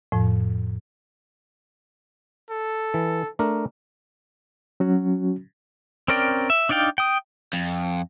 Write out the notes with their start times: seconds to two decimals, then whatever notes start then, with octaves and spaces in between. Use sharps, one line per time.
0.12 F2 A2 F3
2.51 A4
2.94 E3
3.39 A3 D4 A#4
4.80 F#3 C#4 F#4
6.08 C4 C#4 A#4 D5 G5
6.50 E5
6.69 D4 D#4 D5 F5 G5
6.98 G5 D#6
7.53 F2